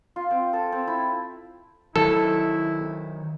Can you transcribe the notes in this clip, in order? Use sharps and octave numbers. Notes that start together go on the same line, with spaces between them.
F4
C4
A4
C4
E4
D#3 F#3 E4 A4